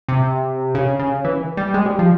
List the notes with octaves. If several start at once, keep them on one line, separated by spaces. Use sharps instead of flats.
C3
C#3
C#3
E3
G3
G#3
G3
F3